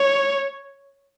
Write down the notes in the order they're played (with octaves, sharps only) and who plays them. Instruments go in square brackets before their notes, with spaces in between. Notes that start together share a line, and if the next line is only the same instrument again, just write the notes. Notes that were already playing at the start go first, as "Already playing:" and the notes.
Already playing: [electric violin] C#5